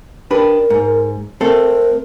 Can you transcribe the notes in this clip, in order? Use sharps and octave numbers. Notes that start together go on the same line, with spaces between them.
D4 G4 A#4 B4
G#2
A3 C4 A4 A#4